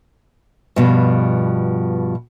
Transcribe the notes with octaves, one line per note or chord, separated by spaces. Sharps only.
G2 B2 F3